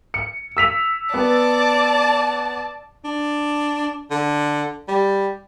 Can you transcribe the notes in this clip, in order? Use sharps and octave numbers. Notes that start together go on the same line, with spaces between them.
C#7
E6 B6 F7
B3 D5 A5
D4
D3
G3